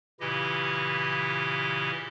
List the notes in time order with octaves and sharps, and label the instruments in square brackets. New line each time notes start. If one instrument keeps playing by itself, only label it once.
[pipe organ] A#2 C#3 E3 E4 G4 D#5